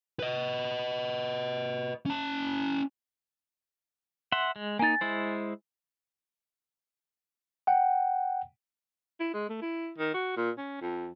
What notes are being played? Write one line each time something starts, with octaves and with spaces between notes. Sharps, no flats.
B4 D#5
C#4 A5
E5 F#5 C6
G#3
A#3 D#4 G#5 A6
G#3 E4 C5
F#5 G5
E4
G#3
A3
E4
D#3
F#4
A#2
C#4
F2